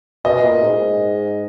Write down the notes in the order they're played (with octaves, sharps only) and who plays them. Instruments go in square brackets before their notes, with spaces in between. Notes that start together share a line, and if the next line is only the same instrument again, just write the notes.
[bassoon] B2 [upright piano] D#5
[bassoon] A#2
G#2